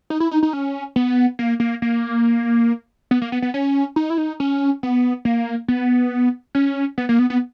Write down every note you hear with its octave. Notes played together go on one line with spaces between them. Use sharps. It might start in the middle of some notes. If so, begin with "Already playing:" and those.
D#4
E4
D#4
D#4
C#4
B3
A#3
A#3
A#3
B3
A#3
B3
B3
C#4
D#4
E4
D#4
C#4
B3
A#3
B3
C#4
B3
A#3
B3
B3